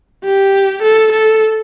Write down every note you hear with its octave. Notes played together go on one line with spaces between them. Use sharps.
G4
A4
A4